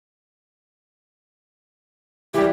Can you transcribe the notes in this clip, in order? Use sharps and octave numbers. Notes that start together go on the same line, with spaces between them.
E3 G3 G4